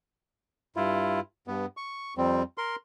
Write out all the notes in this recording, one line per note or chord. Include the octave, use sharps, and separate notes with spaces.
G2 E4 F4
G2 B3
C#6
F2 G3 C4
A#4 C6